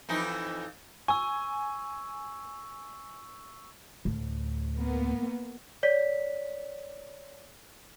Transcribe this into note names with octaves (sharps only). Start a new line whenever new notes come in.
F2 E3 D#4
G#5 C#6 E6
D2 A2
A#3 B3
C#5 D5 B6